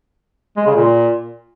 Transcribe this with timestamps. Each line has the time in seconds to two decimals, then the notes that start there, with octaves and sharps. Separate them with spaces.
0.57 G#3
0.66 C#3
0.76 A#2